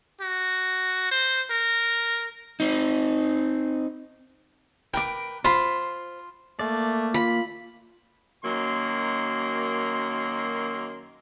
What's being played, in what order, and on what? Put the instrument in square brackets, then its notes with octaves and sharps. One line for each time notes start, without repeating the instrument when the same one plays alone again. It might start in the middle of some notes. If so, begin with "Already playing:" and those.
[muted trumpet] F#4
C5
A#4
[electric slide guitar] C4 D#4
[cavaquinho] A#4 B4 D6 [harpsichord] G5
[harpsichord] F4 [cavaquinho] C5 B5
[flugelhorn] A3 [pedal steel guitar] A#3 D5
[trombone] F4 [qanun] B5
[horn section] F#2 D#3 F#3 A#3 C6